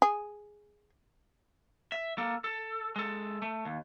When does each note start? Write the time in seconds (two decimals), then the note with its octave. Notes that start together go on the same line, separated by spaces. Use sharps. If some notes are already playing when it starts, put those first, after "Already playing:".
0.02 G#4
1.92 E5
2.18 A#3 A4
2.44 A4
2.96 G#3 A4
3.42 A3
3.65 D#2